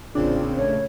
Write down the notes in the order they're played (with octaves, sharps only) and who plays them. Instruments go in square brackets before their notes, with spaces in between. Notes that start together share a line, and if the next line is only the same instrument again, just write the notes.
[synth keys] A1 D4 [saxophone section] A#2 C#3 [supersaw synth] C4 [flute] F4
[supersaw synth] A3 [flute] C#5